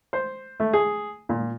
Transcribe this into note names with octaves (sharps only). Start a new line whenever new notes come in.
C5
A3
G#4
A#2